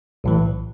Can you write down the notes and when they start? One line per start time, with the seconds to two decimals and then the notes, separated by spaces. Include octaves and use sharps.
0.24 B1 A2 E3